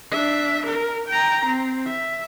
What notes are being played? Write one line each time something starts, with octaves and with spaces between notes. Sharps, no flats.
D4 E5
A#4
G5 A#5
C4
E5